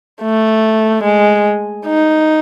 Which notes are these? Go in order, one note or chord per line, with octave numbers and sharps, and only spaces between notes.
A3
G#3
D#4